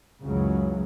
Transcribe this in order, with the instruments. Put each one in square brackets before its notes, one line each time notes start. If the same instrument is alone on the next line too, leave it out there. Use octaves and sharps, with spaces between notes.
[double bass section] C#2 F#2 C#3 E3 F#3